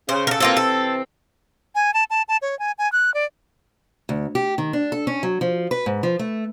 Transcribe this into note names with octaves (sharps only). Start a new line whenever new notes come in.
C#3 C5
A4 A#4
C3 E3 A#3 C4 F4 A4
A4
G#5
A5
A5
A5
C#5
G#5
G#5
F#6
D5
D2
G4
D#3
D4
A4
C#4
F#3
F3
B4
G#2
F3
A3